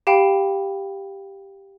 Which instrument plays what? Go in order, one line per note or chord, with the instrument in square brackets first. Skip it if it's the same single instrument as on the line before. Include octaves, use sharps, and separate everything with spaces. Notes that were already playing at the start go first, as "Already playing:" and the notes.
[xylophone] G4 F5 G5 B5